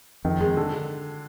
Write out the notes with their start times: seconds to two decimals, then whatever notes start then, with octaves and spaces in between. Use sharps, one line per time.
0.25 F2 D#3
0.41 G#3
0.57 D3